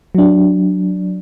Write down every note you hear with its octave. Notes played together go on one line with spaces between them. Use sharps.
F#3 D4